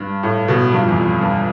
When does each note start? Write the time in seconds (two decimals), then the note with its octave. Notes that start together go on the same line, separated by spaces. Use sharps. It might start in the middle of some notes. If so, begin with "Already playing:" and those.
Already playing: G2
0.23 A2
0.48 B2
0.72 G2
0.80 F2
0.88 E2
0.96 F2
1.21 G2